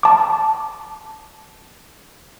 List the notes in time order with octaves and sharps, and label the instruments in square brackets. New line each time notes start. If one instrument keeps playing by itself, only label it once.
[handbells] A5 D6